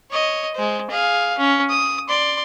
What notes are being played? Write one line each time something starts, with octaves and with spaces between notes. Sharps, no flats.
C#5 D#5
G#3 C5
G#4 F5
C#4
D#6
D5 C6